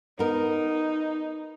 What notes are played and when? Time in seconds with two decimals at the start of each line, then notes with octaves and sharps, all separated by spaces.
0.19 B3 D#4 A#4